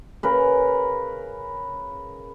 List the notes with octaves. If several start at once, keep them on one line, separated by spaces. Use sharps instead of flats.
C#3 A#4 B4